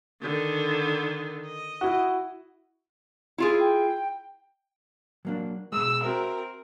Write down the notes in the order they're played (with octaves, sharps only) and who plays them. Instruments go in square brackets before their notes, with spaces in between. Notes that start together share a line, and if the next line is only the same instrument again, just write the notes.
[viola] D3 D#3
D#5
[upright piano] E4 F#4
[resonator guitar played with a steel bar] E4 F4 G#4
[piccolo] G5
[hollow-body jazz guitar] F#3 A#3 D4
[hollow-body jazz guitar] B2 G#3 [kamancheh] E6
[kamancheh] C4 A#4 [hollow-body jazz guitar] F#4 E5